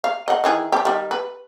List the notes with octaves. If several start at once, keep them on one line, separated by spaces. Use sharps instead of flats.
F5
D#5 F#5
D#3 E3 G#4
D4 G4
D#3 G3
B4